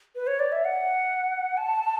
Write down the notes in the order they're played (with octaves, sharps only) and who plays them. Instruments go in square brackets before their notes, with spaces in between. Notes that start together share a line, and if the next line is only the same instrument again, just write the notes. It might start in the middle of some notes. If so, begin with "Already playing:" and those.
[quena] B4
C#5
D5
E5
F#5
A5